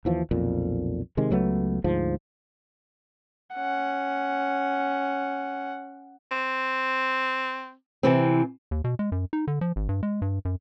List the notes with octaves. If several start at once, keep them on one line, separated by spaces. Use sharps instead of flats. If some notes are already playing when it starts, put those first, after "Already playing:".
D#2 E3 F3
B1 F2 A#2
C3 D#3 G#3
C#2 F#3 A3 B3
D2 G#2 F3
C#4 F#5
C4
C3 E3 C4
D#2
B2
G#3
F#2
D#4
D3
F3
G#1
G2
G#3
G2
F#2